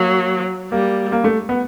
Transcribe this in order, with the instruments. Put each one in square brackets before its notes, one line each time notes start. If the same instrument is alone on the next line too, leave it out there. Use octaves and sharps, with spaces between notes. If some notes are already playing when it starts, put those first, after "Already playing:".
Already playing: [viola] F#3 [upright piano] A#3
[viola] G3 [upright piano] A#3
[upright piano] A#3
A3
B3